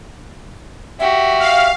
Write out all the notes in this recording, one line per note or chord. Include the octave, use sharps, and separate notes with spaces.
F#4 G4 E5
F5